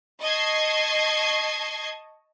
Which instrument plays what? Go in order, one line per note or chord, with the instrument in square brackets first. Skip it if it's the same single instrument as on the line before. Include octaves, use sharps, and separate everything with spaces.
[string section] D#5 A5 C#6 G#6 C7